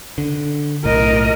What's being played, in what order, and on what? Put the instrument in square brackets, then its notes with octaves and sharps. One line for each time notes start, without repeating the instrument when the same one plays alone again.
[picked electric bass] D3
[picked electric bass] B1 A2 [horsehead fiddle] A#4 D#5